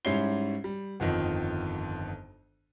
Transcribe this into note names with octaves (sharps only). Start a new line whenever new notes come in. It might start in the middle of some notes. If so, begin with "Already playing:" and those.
G#2 G3 C#4 E4 C7 G7
G3
G1 F2 D#3